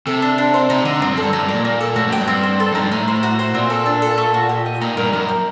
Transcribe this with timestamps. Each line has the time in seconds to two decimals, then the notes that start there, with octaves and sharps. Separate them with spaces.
0.07 C3 A4
0.22 D4
0.38 D4
0.54 C5
0.70 C3 D#4
0.85 D3 D#5
1.01 G2 C4
1.12 F#2
1.17 A4
1.23 G2
1.33 F#2 D#4
1.44 G2 D5
1.54 A#2
1.65 A#2 A#3
1.81 A4
1.96 A2 F#4
2.07 F#2
2.12 G2 G5
2.28 G2 C4
2.43 C5
2.60 A4
2.72 F#2 D#4
2.82 G2
2.91 A2 D#4
3.08 C5
3.23 F#4
3.39 C5
3.54 A#2 C4
3.70 A4
3.86 D4
4.02 A4
4.18 A3
4.34 F#4
4.49 G4
4.66 D#5
4.81 A#2 D#4
4.97 G2 A#4
5.13 F#2 A#4
5.29 G5